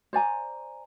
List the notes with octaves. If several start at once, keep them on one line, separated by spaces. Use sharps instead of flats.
C5 D5 G#5 A#5